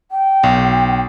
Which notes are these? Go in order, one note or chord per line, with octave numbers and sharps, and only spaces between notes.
G5
B1